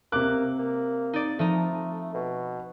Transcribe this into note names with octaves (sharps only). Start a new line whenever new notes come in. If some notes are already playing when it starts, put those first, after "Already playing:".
C3 A#3 D6 F#6
A#3
D#4 D5
F3 A3 D#4 A#5
B2